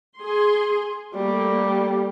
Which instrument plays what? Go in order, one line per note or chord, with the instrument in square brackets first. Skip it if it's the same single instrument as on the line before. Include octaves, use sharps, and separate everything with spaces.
[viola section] G#4 C6
[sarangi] G3 [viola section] A3 A#3